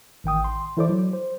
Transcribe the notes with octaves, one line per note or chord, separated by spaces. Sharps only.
A1 D#3 G5 D#6
C6
E3 E4 A4 C5 D5 D6
F#3
C5